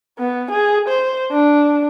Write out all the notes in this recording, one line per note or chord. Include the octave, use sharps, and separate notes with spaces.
B3
G#4
C5
D4